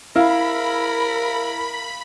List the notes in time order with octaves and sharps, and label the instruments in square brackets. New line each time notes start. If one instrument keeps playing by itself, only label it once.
[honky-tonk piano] E4 [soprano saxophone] A#4 [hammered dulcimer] F5 [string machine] B5